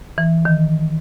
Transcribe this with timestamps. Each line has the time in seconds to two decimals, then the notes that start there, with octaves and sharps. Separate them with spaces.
0.18 E3
0.45 D#3